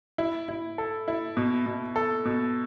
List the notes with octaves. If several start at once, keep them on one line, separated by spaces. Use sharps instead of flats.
E4
E4
A4
E4
B2
B2
A4
B2